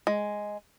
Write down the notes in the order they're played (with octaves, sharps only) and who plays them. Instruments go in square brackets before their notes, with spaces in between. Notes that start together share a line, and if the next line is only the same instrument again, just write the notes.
[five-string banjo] G#3